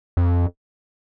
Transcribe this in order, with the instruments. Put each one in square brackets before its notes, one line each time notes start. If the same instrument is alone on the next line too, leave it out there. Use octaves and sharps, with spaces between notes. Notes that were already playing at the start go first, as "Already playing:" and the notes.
[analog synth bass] F2